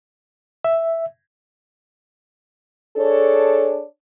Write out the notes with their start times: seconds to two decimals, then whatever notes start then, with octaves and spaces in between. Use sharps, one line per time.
0.64 E5
2.96 D4 G#4 A4 C#5